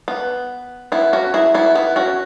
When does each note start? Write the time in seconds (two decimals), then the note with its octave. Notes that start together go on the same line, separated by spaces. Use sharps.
0.08 B3
0.92 B3 E4
1.13 C#4 F#4
1.34 E4 G#4
1.54 B3 E4
1.75 B3 E4
1.96 C#4 F#4